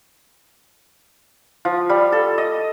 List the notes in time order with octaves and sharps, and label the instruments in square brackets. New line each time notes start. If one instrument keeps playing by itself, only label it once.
[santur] F3
G3
A4
D#5